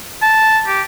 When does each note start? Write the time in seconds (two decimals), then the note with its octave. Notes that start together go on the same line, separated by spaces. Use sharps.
0.22 A5
0.67 G4